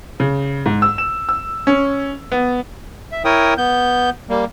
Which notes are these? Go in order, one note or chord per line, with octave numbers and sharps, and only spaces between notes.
C#3
G#2
E6
E7
E6
C#4
B3
E5
E4 A#4 C#5 G5 D#6
B3 G6
G3 A#3